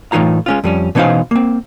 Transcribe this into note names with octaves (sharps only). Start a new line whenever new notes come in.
A2 E3 D#4 F4 A#5
G#3 C#4 F4
F2 G3 C#4
B2 E3 C#4 D#4 C5 F5
A#3 C4